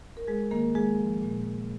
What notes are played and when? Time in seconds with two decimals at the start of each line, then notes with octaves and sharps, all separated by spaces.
0.17 A#4
0.27 G#3 G#4
0.51 D#3 A#3 A#4
0.75 G#3 G#4
0.99 F3
1.23 A#2